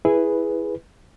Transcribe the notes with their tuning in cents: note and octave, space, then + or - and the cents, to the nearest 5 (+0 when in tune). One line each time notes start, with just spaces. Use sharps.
E4 +0 G#4 +0 B4 +0